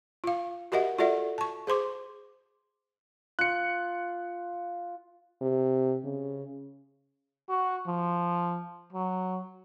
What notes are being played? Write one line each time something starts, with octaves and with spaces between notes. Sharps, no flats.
F4 F5
F#4 G4 A#4 D#5 E5 F#5
F4 F#4 A4 D5 E5 F#5
A5 C#6
G#4 C5 C6 D6
F4 F#6 C#7
C3
C#3
F#4
F3
F#3